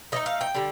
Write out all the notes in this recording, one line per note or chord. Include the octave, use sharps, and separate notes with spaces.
D3 A3 D#4 D#5
F5
G5
D3 G3 D4